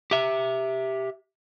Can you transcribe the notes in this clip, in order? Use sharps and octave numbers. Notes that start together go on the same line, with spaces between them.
G4 E5